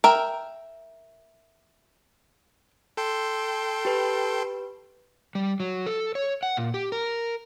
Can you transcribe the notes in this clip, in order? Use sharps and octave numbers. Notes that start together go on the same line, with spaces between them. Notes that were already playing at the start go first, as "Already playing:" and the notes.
A#4 E5 G5
A4 G5 C6
G4 B4
G3
F#3
A4
C#5
F#5
A#2
G4
A#4